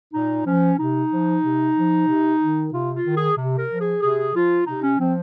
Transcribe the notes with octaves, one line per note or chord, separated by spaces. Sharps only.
A#2 D#4
F3 C#4
C3 D#4
F3
C3
F3
C3
D#3
C3 F4
F4
D#3
G#4
C3
A#4
F3
G#4
C3 G#4
F3 F4
C3 D#4
C#4
F3 C4